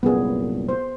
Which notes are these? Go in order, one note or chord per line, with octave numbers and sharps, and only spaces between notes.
C2 F#2 A#2 B3 G#4
C5